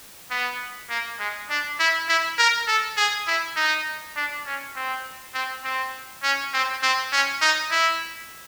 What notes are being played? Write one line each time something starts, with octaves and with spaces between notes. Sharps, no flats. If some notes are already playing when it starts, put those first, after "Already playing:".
B3
A#3
G#3
D4
E4
E4
A#4
A4
G#4
E4
D#4
D4
C#4
C4
C4
C4
C#4
C4
C4
C#4
D#4
E4